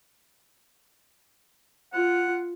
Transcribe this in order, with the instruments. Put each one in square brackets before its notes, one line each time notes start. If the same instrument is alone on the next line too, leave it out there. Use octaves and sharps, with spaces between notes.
[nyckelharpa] F4 [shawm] F#5